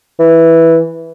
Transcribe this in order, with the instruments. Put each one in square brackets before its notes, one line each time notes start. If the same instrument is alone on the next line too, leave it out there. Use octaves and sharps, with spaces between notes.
[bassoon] E3